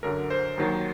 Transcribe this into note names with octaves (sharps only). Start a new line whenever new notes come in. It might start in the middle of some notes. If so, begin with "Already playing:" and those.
F#2 D3 F#3 A#4
C5
D#2 D#3 F#3